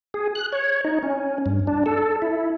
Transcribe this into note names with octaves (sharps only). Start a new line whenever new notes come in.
G#4
F#6
C#5
D#4
C#4
G2
D4
A4
E4